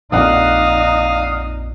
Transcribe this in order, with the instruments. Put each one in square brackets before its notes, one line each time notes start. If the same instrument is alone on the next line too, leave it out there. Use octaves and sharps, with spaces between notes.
[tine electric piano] A#1 F2 [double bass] D#4 [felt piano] D5 F#5 [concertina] F5 D#6